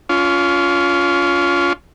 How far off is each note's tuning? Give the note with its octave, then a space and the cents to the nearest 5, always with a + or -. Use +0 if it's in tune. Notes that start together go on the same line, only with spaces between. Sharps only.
C#4 +35 F4 +0